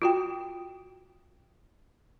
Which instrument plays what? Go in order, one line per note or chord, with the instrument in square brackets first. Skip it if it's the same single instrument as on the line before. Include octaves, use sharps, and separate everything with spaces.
[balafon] F4 F#4 G5